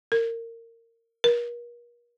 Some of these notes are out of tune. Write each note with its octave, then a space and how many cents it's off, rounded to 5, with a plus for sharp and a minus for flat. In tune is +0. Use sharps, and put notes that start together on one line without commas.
A#4 -25
A#4 +40